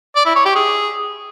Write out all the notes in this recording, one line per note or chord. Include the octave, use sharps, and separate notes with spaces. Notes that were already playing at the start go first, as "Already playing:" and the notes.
D5
E4
C#5
G4
G#4